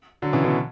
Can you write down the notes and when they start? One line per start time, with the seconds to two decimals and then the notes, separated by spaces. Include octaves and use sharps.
0.22 D3 F#3
0.33 C#3 E3
0.44 B2 D3